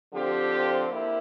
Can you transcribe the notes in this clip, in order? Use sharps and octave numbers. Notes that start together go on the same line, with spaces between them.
D3 F3 C4 G4
A#3 E4